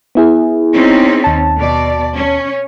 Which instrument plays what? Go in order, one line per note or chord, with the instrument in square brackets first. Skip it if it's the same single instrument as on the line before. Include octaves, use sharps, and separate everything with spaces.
[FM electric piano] B3 E4 G#4
[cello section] C4 C#4 D#4
[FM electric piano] D#2 A5
[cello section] B2 D5
C#4